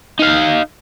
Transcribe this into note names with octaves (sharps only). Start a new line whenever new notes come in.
D#4 F5